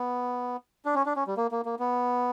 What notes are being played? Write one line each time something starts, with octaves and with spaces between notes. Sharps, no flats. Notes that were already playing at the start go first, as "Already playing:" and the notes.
Already playing: B3
D4
C#4
D4
C#4
G3
A#3
A#3
A#3
B3